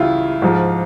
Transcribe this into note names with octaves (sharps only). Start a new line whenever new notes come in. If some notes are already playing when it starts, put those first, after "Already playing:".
Already playing: C#2 C#3 E3 E4 F4
G#2 F3